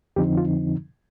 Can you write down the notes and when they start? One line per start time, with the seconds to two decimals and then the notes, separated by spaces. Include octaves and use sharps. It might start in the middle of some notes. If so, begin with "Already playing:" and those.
0.16 F2 D3 F3 C4 D#4 G4
0.37 F4